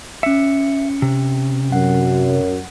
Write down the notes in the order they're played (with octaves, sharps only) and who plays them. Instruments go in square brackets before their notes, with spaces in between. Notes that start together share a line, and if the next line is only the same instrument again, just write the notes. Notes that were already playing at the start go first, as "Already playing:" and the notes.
[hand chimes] C#4 C#7 [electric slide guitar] E5
[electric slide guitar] C3
[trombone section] F#2 [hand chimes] F#5